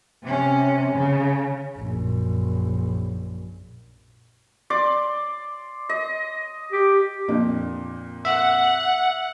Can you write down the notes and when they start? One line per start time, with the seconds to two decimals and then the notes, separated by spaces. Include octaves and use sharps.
0.23 C3 C#4
0.94 C#3
1.77 A#1 F#2
4.70 D5 C6 D6
5.89 D#5
6.72 G4
7.28 F2 A#2 D4
8.25 E5 F#5